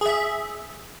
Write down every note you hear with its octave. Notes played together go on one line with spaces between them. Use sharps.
G#4 E5